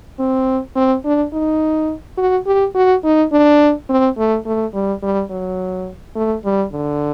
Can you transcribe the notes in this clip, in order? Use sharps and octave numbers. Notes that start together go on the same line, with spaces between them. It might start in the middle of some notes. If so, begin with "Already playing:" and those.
C4
C4
D4
D#4
F#4
G4
F#4
D#4
D4
C4
A3
A3
G3
G3
F#3
A3
G3
D3